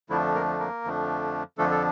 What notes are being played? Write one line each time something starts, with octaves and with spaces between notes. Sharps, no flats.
F2 D3 F3 A3 D4 E4
A#3 A#4
A#3 A#4
F2 D3 F3 A3 D4
F2 D3 F3 A3 D4 A4
A4